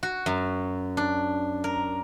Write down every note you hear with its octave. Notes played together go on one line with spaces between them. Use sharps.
F#4
F#2
D4
A#4